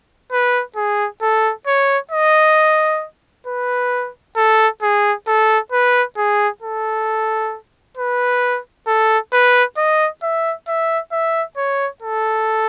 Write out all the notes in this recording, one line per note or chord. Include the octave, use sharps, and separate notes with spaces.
B4
G#4
A4
C#5
D#5
B4
A4
G#4
A4
B4
G#4
A4
B4
A4
B4
D#5
E5
E5
E5
C#5
A4